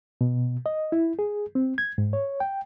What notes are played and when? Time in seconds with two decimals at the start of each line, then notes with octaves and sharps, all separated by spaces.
0.21 B2
0.66 D#5
0.92 E4
1.19 G#4
1.55 C4
1.78 G#6
1.98 G#2
2.13 C#5
2.40 G5